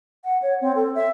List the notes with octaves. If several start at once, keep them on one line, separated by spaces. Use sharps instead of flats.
F#5
C#5
C4
A4
E5